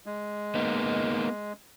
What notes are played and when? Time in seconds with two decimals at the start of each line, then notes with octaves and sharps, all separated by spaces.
0.06 G#3
0.55 A#3 B3 D#4